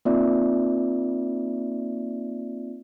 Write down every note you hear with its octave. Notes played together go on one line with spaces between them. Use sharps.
A#3 C4 D#4 F4 D5 E5